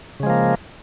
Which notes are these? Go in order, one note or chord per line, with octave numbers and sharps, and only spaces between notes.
C#3 F3 G#3 A#3